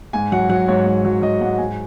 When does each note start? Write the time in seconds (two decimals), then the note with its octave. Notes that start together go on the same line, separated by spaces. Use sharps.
0.13 G#2 G#5
0.32 F#3 F#5
0.49 F#3 F#5
0.68 G#2 C#5
0.85 G#2
1.05 F#3
1.22 F#3 D#5
1.41 G#2 F#5
1.58 G#2 G#5